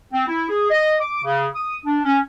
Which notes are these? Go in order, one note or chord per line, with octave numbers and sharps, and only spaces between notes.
C4
E4
G#4
D#5
D6
C#3
D#6
D4
C#4